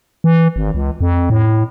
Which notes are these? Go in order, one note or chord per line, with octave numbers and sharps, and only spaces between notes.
E3
G#1
C#2
F2
A2